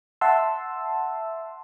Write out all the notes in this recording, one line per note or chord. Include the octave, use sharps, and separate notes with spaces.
E5 F#5 A5 C6 E6